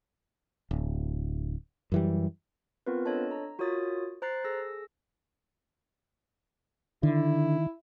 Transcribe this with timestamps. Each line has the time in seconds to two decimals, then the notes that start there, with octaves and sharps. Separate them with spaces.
0.71 D1
1.92 F#2 E3 G3
2.87 B3 C4 F4 A#4 B4
3.06 D4 A4 C#5 D#5 A5
3.31 A#5
3.59 F4 F#4 A#4 C#5 D#6 A6
4.22 C5 A#5 F#6 A6 C7
4.44 G#4 A4 E6 A#6
7.03 D3 D#3 E4